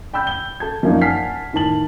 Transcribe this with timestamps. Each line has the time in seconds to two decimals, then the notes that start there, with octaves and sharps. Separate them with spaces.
0.14 G5 B5 E6 G6
0.27 G7
0.60 A4 A5 G#6
0.83 F#2 F3 A#3 D4 D#4
1.01 F#5 G#5 A5 F6 B6 C7
1.53 A2 D#3 E3 A5 F#7